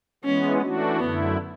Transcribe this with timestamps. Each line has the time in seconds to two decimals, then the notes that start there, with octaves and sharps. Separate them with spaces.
0.24 E3 G#3 B3 C#4
0.61 E3 A3 D4 F#4
1.00 F#2 D3 A3 B3 E4